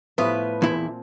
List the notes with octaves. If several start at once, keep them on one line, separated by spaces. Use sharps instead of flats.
A2 F3 B3 G4 B4
E2 A#2 C4 E4